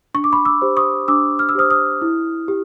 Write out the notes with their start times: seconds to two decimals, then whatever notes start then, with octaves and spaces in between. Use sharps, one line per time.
0.14 D4 C#6
0.24 D6
0.33 B5 C#6
0.45 D6 E6
0.62 G4 C5
0.77 C#6 D#6
1.08 D4 D6 E6
1.39 F6
1.49 E6
1.55 G4 C5 D#6 F6
1.70 D#6 F6
2.02 E4
2.48 G4